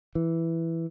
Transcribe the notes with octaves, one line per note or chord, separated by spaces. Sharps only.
E3